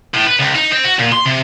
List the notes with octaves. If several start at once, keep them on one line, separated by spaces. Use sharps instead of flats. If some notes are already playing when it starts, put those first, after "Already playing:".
A2
B4
C#2
D#4
C4
F#4
A#2
C6
C3